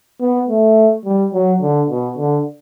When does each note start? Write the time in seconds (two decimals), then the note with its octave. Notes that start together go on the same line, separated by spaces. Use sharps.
0.21 B3
0.49 A3
1.05 G3
1.33 F#3
1.62 D3
1.90 B2
2.18 D3